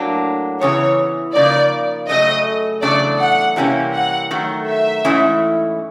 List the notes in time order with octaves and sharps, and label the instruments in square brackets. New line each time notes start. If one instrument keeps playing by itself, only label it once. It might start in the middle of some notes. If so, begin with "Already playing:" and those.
Already playing: [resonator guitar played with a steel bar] A2 F#3 A#3 D4
[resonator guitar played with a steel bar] E2 C#3 E3 [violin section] C#5
[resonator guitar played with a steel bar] C#3 F3 A#3 D#4 [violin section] D5
[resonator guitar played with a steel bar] C#3 F#3 A3 [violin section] D#5
[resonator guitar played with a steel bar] E2 C#3 F#3 A3 D4 [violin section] D5
[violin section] F#5
[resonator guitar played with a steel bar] C3 E3 G3 A#3 C#4
[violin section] F#5
[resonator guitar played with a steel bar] D#3 F#3 A3
[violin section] E5
[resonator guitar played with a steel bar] G#2 E3 A3 C#4 E4